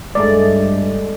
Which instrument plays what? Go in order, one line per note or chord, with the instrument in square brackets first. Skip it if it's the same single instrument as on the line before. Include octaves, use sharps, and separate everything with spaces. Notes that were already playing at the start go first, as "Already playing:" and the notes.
[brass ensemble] G2 [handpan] G#3 A3 D5